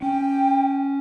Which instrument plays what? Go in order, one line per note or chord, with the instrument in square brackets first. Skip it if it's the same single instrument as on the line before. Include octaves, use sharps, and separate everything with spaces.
[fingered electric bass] C#4 [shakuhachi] G5